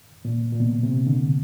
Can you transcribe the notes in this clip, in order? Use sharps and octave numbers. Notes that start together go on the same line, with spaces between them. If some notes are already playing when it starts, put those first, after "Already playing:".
A#2
A#2
B2
C3
D3